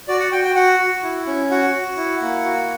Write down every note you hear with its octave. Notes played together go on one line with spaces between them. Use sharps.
F#4 D5
F#5
F#4 G5
G5
F#4 F#5
F#4
E4
C#4
F#4 F#5
F#4
E4
A#3
F#4